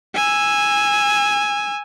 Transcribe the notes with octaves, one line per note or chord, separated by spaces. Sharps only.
G#5 E6